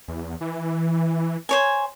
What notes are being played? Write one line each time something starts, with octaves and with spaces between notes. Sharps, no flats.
E2
E3
C5 C#5 G#5